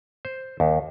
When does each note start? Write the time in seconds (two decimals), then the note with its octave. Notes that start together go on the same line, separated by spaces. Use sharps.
0.25 C5
0.60 D#2